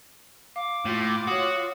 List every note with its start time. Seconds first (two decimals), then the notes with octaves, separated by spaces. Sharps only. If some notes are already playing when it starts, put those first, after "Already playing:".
0.56 F5 D6
0.85 A2 F4
1.27 F#4 C#5 D#6